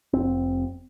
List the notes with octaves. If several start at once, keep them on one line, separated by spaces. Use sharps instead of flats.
F1 C4